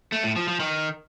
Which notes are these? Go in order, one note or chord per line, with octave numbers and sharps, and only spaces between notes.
A3
A2
F3
F3
D#3